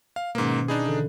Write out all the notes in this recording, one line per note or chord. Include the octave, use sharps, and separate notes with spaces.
F5
G#2 B2 D#3 A#3 C#4
D4 D#4 G#4 B5
D3 E3 A4